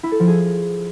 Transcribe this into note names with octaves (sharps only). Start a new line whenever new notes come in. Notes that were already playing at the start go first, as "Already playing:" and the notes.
E4
A4
F3
G#4